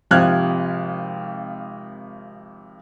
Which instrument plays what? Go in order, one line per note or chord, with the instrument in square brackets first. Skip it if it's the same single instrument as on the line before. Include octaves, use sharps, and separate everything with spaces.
[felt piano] G#1 C3 F3 F6 F#6 G#6